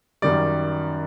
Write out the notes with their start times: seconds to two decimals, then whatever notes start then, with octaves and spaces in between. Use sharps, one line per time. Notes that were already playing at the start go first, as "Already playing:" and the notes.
0.22 F#2 D#3 G3 D5